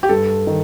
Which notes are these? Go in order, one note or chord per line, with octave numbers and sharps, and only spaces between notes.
G4
G2 A4
D#3